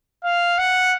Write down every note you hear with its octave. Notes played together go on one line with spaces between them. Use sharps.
F5
F#5